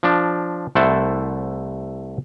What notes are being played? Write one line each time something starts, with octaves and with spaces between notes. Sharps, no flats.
F3 D4
C2 A3 E4 C5 F#5 A5